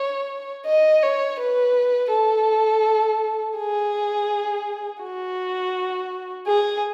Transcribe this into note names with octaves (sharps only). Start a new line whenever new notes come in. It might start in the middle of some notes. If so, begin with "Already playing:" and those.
Already playing: C#5
D#5
C#5
B4
A4
G#4
F#4
G#4